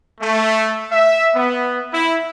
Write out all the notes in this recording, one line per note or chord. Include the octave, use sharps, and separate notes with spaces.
A3
E5
B3
E4